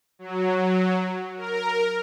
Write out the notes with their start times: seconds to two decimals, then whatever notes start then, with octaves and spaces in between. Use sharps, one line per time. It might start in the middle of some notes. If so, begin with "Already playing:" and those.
0.19 F#3
1.36 A#4